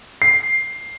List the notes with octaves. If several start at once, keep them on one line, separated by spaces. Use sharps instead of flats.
C7